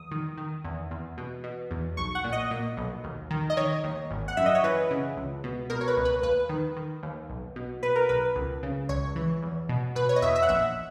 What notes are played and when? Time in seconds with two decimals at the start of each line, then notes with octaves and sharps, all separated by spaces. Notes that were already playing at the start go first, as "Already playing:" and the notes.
Already playing: E2 D#6
0.11 D#3
0.37 D#3
0.64 E2
0.91 E2
1.18 B2
1.44 B2
1.71 E2
1.97 B1 C#6
2.15 F#5
2.24 A#2
2.33 D#5
2.51 A#2
2.77 B1
3.04 D#2
3.30 D#3
3.50 D#5
3.57 D#3 C#5
3.84 D#2
4.10 G#1
4.28 F#5
4.37 F#2 E5
4.46 D#5
4.55 C#5
4.64 E3 B4
4.91 C#3
5.17 C#2
5.44 B2
5.70 B2 A#4
5.81 C#5
5.88 B4
5.97 C#2
6.05 B4
6.23 D#2 B4
6.49 D#3
6.76 D#3
7.03 D#2
7.29 B1
7.56 B2
7.83 B2 B4
7.96 A#4
8.09 B1 B4
8.36 C#2
8.63 C#3
8.89 C#2 C#5
9.16 E3
9.43 E2
9.69 B2
9.95 B2 B4
10.09 C#5
10.16 D#5
10.22 E2 E5
10.36 E5
10.42 F#5
10.49 A#1 E5